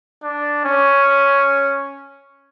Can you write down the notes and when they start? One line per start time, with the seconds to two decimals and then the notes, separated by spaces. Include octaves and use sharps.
0.23 D4
0.65 C#4